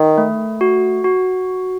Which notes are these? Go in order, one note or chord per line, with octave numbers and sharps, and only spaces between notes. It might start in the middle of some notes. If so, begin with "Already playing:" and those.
Already playing: D#3
A3
F#4
F#4